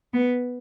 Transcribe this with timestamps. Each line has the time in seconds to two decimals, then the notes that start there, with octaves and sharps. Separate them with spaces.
0.13 B3